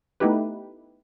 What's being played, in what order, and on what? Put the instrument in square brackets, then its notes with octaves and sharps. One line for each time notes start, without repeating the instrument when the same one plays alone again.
[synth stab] A3 B3 D#4 E4 G4 B4